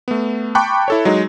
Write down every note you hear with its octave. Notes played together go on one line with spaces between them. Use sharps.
A3 B3
G5 A5 B5 C#6 D6 F#6
E4 A4 C#5
F#3 G#3 D#4